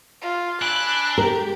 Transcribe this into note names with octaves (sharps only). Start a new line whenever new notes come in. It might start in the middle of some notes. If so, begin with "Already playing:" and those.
F4
D4 G#5 B5 E6 F#6
G#3 G4 A#4